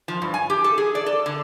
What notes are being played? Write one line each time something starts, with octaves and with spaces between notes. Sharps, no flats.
F3
G2
G#5
G4
A4
G#4
D5
A4
D3